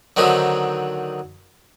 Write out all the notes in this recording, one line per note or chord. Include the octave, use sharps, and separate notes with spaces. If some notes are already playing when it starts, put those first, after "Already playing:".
D3 D#3 F#3 C4 D#4